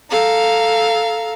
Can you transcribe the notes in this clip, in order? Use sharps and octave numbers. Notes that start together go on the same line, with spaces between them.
A4 F5 A#5